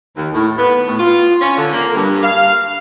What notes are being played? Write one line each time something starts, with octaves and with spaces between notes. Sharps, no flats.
D#2
A2
B3
A2
F4
C#4
D3
A#3
G2
F5